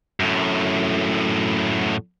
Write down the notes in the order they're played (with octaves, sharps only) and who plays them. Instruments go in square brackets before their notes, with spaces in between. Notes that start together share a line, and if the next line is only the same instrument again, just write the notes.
[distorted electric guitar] F#2 A2